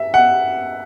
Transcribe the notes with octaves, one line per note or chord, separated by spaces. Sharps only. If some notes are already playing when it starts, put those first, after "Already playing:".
Already playing: E5
F#5